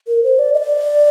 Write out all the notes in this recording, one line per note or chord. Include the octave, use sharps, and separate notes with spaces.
A#4
C5
D5
D#5
D5